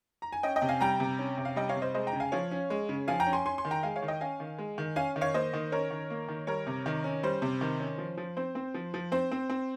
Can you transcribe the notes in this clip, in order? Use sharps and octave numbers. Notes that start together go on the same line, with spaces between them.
A#5
G#5
C#4 D#5 G5
D#5 G5
C3
F5 G#5
G3 G5 A#5
C3
C#4
C3
F5
G3 D#5 G5
C#5 F5
C3
C5 D#5
G#3 C5 D#5
G5 A#5
C#3
F5 G#5
F3 C#5 F5
C#4
G#3
C#3
F3 F5 G#5
G5 A#5
C#4
G#5 C6
C#4 G#5 C6
G#5 C6
D#3
G5 A#5
G#3 F5 G#5
C#5 F5
D#3
D#5 G5
C#4 F5 G#5
D#3
G#3
D#3
C#4 F5 G#5
D#3
C#5 F5
A#3 C5 D#5
D#3
C#4 A#4 C#5
D#3
A#3
D#3
G3 A#4 C#5
C3
D#3
C#4
G3 C5
C3
D#3
C#4
F3
F3
C4 C5
C4
F3
F3
C4 C5
C4
C4